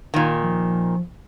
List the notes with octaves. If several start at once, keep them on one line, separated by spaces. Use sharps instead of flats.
A#2 D#3
F3